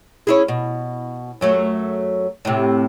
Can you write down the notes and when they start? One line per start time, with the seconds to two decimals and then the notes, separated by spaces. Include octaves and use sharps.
0.27 C#4 E4 G#4
0.48 B2
1.41 F#2 F#3 A3
2.45 A2 C3